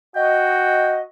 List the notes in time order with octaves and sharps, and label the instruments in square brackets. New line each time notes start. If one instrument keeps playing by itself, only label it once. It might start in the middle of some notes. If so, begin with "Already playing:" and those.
[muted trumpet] F#4 [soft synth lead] D#5 [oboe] G5